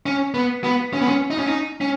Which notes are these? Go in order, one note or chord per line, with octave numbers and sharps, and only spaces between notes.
C#4
B3
B3
C#4
B3
C#4
D#4
C#4
D#4
C#4